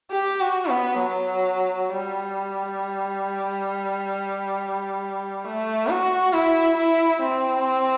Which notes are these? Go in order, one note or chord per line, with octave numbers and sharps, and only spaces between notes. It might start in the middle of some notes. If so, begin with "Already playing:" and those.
G4
F#4
B3
F#3
G3
A3
F#4
E4
E4
C4